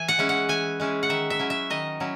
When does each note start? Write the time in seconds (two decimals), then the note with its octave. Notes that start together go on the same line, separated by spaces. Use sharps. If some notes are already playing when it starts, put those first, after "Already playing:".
Already playing: E3 G#5
0.08 F#5
0.18 G#3 C#4 E4
0.29 F#5
0.49 E3 G#5
0.80 G#3 C#4 E4
1.03 F#5
1.09 D#3 E5
1.30 E5
1.39 F#3 C#4 E4
1.50 E5
1.70 D#3 D#5
2.00 F#3 C#4 E4